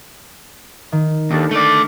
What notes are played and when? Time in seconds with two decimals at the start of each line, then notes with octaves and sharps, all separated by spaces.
0.92 D#3
1.31 D#2 D4 A4
1.51 A3 D5